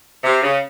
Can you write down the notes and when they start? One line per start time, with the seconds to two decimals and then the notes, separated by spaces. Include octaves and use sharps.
0.24 C3
0.43 C#3